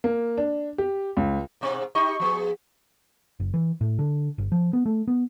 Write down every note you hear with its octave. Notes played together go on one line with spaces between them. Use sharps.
A#3
D4
G4
C#2
G#2 B2 C4
D#4 G4 D#5 C#6
F3 B3 G#4
F#1
E3
A2
D3
G1
F3
B3
A3
B3